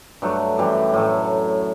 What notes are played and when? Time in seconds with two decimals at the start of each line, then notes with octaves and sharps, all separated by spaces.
0.22 G2 F#3 A3
0.58 F#2 E3 G3
0.94 A2 F#3 A3